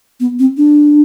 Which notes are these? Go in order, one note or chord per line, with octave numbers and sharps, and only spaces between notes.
B3
C4
D4